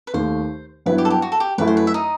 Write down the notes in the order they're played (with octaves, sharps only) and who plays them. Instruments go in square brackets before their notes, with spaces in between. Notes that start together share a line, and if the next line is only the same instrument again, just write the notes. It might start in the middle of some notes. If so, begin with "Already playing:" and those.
[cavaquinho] B4
[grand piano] D#2 D#3 A3 [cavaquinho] C5
[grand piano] G2 F#3 B3 E4 [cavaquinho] B4
[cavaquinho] G4
A4
G4
F#4
A4
G4
[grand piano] F#2 F#3 A3 E4 [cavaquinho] B4
[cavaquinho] C5
B4
E5
D#4 D#5